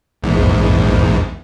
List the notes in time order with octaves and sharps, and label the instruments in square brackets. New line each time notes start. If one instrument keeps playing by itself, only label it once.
[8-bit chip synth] A#1 E2 G#2